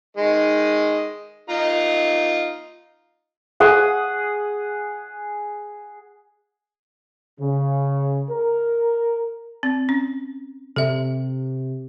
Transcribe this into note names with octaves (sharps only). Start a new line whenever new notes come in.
D#3 G#3 D#5
D#4 F4 A#5
G#4 F#5 D#6
C#3
A#4
C4
C#4
C3 A4 E5